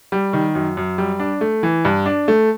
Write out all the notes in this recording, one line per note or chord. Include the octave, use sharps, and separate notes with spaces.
G3
D#3
F#2
F#2
G3
D4
A3
E3
G2
D4
A3